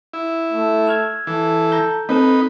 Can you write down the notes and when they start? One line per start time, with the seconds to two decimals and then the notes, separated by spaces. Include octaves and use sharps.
0.13 E4
0.52 A3
0.87 E6 F6 G#6
1.27 E3 A4
1.72 A#5 G6
2.09 A#3 C4 D#4 A4 B4